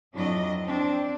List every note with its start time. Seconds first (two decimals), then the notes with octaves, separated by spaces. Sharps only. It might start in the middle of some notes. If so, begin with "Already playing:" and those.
0.15 F2 F#3 D4 E4 D#5
0.63 C4 D4